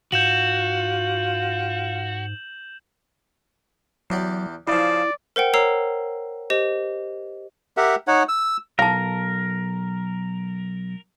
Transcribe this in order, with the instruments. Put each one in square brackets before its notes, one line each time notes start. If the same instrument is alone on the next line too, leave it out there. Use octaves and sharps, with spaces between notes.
[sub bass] G#2 [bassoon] F4 [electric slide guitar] F#4 [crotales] G6 E7 F#7
[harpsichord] E2 G4 D5 [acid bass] F#3
[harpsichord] C#3 F3 [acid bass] E4 [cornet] D5
[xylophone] A#4 C5 F#5 G5
A#4 C#5 A#5 E6 C7
G4 C5 D#5
[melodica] G4 A#4 E5 F#5
D#4 C#5 F#5
E6
[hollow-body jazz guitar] B1 [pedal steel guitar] A#4 [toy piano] F5 A5